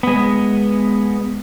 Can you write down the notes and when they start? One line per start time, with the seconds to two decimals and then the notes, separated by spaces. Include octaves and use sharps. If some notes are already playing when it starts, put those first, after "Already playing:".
0.03 G#3 B3